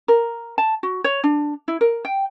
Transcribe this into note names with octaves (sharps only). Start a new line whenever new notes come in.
A#4
A5
F#4
C#5
D4
E4
A#4
G5